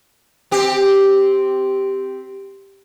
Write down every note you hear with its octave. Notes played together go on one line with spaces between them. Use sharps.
C4 G4